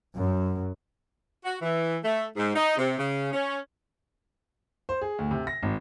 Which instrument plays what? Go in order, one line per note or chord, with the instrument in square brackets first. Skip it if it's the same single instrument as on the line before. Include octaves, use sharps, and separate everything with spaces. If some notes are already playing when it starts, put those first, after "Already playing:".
[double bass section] F#2
[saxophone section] F#4
E3
A3
G#2
D#4
C3
C#3
C#4
[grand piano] C5
G#4
D2
C3
A#6
G#1